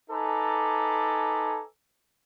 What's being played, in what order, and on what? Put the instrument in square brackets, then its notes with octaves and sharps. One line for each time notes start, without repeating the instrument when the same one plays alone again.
[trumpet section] D#4 A4 B4 G#5 A#5 D6